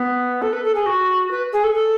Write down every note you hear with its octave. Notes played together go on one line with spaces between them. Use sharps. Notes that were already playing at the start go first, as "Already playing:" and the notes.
Already playing: B3
A4
B4
A4
G#4
F#4
B4
G#4
A4
A4